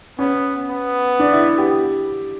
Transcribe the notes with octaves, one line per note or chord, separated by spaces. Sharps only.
B3 C#4
B3
D4
E4
G4